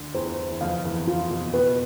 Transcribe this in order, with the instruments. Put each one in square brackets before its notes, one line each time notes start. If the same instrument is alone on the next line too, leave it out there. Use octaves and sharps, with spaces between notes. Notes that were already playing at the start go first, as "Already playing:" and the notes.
Already playing: [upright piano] D2 D3
[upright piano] E2 E3 [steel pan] C5
[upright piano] E3
[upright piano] F2 F3 [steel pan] F5
[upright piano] E2 E3
[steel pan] F4
[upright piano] B2
[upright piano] B2 [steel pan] B4